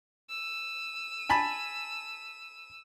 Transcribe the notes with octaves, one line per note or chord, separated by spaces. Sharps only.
E6 D#7
G#5 A5 B5